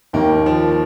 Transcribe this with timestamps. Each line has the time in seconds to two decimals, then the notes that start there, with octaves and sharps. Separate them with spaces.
0.13 D#2 D#3 A#3
0.46 F3